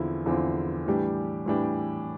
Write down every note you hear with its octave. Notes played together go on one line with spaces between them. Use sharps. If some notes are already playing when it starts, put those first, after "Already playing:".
Already playing: E2 D3 F3 C4 E4
E2 D3 F3 C4 E4
A2 E3 G3 D4 G4
A2 E3 G3 D4 G4